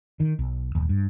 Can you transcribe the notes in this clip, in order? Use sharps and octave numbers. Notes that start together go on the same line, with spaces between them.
D#3
B1
D#1
G2